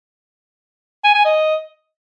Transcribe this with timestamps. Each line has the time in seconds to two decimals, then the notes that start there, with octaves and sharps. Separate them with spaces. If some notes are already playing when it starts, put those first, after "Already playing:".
1.04 G#5
1.14 G#5
1.25 D#5